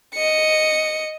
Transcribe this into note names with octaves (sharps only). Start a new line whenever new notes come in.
D#5 C#7